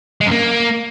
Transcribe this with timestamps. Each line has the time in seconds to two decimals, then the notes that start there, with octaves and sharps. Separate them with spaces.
0.21 G#3
0.26 F#2
0.31 A#3